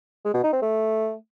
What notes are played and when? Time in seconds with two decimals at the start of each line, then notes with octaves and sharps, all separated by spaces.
0.25 G#3
0.34 B2
0.44 D#4
0.53 C4
0.62 A3